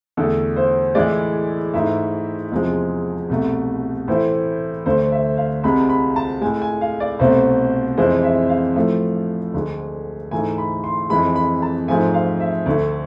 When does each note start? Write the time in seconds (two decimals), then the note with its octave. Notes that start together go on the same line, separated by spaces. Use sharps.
0.17 E2 D3 A3 A4
0.56 C5
0.95 A2 E3 G#3 D5
1.74 G#2 E3 A3 E5
2.52 E2 C3 F3 G#3
3.30 C2 B2 A3
4.08 A2 E3 A3 C5
4.86 D2 D3 A3 C5
5.12 E5
5.37 F5
5.63 C2 C3 G#3 B5
5.90 B5
6.16 A5
6.41 G#3 G#5
6.45 A2
6.62 G#5
6.81 F5
7.00 D5
7.19 C2 B2 A3 C5
7.98 F2 E3 G#3 C5
8.23 E5
8.49 F5
8.76 A2 F3 A3
9.54 D2 D3 G#3
10.31 G#2 E3 A3 G#5
10.58 B5
10.84 C6
11.10 F2 E3 G#3 B5
11.36 B5
11.62 A5
11.88 G#2 F3 A3 G#5
12.14 F5
12.40 E5
12.66 D2 D3 A3